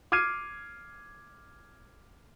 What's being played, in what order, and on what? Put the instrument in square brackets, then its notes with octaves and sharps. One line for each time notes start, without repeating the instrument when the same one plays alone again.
[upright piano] D6 F6 G#6 C7 D#7